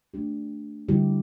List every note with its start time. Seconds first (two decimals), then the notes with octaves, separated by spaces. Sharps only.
0.14 A3 D4 G4
0.88 D3 G3 E4 G4